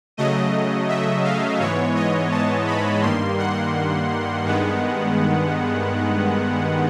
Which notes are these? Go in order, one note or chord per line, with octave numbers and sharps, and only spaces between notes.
C#3 F#3 A3 D#5
E5
F5
G#2 E3 G#3 B3 C#5
D#5
A5
B5
G2 D#3 G3 A#3 C6
F#5
G2 D#3 G#3 B3